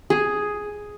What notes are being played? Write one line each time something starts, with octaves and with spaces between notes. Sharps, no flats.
G#4